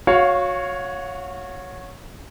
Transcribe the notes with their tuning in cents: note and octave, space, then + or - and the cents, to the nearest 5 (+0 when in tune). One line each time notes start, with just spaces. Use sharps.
F#4 -25 C#5 +0 F5 +0